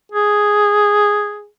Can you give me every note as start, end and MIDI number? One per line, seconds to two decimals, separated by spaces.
0.12 1.47 68